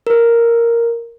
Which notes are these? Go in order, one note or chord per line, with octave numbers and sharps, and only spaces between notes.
A#4